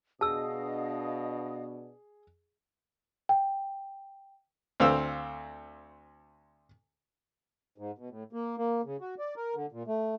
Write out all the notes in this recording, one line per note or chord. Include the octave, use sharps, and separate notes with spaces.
B2 D4 G#4 D#5 F5 A5 D#6 E6
G5
D2 C4 F5 E6
G#2
B2
A2
A#3
A#3
C#3
F#4
D5
A#4
D3
A#2
A3